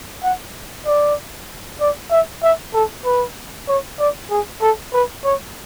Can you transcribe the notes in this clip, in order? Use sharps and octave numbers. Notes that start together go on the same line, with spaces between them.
F#5
D5
D5
E5
E5
A4
B4
C#5
D5
G#4
A4
B4
C#5